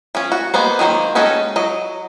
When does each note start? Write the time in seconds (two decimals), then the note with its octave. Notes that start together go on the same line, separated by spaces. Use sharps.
0.15 F3 C#4
0.32 F#4
0.54 G#3 A#3 B3 C5
0.79 D#3 F#3 A#3 C5
1.15 G#3 C#4 D#4 F#4 A4
1.56 F#3 D#5